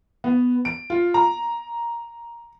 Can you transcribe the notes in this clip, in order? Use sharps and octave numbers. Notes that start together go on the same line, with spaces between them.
B3
D7
F4
A#5